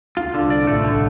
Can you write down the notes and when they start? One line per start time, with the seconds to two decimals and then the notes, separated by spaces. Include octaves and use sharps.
0.17 D2 D3 F4
0.34 D3
0.42 C2 C3
0.50 D5
0.67 A1 A2 A3
0.84 D3